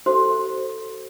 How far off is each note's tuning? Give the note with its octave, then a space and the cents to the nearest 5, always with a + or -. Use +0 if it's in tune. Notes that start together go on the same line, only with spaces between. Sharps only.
F#4 +35 A4 +10 C5 +0